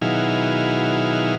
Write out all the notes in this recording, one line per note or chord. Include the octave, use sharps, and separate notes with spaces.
B2 D#3 F#3 E4 G#4 F5